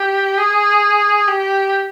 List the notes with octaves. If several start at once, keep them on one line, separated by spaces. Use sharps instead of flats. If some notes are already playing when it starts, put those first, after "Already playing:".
Already playing: G4
G#4
G4